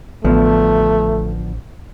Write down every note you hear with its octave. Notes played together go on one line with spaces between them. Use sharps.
A1 D3 F3 A3 B3